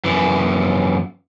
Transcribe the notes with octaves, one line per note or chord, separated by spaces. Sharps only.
F#2 E3